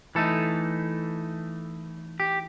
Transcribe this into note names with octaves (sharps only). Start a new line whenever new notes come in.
E3 A3 D#4 A4
G4